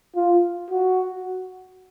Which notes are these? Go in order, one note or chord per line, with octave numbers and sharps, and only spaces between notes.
F4
F#4